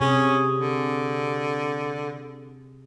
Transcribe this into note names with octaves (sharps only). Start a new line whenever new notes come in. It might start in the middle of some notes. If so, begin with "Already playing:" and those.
C3 C#4 G#4
D3